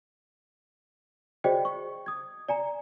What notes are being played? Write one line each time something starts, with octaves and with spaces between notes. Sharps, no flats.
F#4 G#4 C5 D5 D#5 G5
C#6
D#6 G#6
D5 G#5 A#5